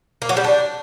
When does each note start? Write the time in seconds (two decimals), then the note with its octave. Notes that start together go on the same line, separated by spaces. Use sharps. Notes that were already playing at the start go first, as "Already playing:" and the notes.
0.22 A#3
0.29 F#3
0.37 G3
0.44 D4